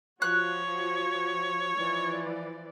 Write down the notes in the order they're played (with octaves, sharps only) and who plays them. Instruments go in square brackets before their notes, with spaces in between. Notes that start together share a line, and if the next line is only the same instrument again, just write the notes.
[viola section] F3 F#4 [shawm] C#5 [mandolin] F#6
[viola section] E3 F3 D5